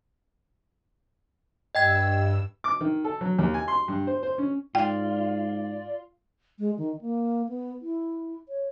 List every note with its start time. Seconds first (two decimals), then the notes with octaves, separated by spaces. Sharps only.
1.75 G2 D#5 G5 E6 G#6
2.64 D6
2.81 D#3
3.04 A4
3.21 F#3
3.38 D#2
3.54 G#5
3.68 C6
3.88 G2
4.07 C5
4.23 C5
4.38 C#4
4.75 G#2 F4 D5 G5
6.59 G#3
6.78 D#3
7.01 A#3
7.49 B3
7.82 E4
8.49 C#5